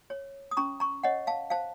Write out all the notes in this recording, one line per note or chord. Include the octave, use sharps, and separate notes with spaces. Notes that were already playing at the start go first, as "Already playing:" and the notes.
C#5
D#6
C#4 A#5 C#6
A#5 C#6
C#5 D#5 F#5
F5 A5
C5 F5 A5